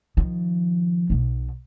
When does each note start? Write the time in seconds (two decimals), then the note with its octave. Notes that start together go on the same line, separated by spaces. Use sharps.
0.17 D#3 F3
1.10 B1 B2